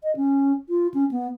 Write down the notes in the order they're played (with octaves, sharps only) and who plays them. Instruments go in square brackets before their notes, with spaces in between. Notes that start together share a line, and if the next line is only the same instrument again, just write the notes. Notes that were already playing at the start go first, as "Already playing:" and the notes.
[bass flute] D#5
C#4
F4
C#4
B3